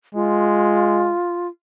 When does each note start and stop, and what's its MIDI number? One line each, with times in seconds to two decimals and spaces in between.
0.15 1.15 56
0.15 1.47 65